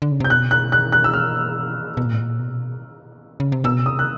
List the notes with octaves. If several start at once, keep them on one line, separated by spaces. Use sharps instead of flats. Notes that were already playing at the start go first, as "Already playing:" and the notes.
D3
C#3
C3 G6
B2 F#6
F#6
F#6
F#6
E6
F6
B2
A#2
A2
A#2
B2
C#3
C3
B2 E6
C3 D#6
F#6